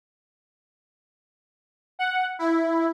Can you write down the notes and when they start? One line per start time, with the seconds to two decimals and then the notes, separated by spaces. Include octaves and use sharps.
1.99 F#5
2.39 E4